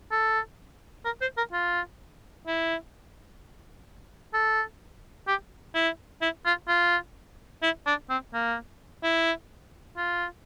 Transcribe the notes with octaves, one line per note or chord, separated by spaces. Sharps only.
A4
A#4
C5
A#4
F4
E4
A4
G4
E4
E4
F4
F4
E4
D4
C4
A#3
E4
F4